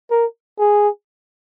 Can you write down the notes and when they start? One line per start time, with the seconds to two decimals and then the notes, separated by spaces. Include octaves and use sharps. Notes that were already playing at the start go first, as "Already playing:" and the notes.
0.11 A#4
0.59 G#4